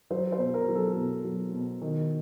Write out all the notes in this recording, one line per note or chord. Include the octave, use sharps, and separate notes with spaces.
F#3 C5
C5
B2
A#4
F#3
A4
B2
F#3
B2
D#3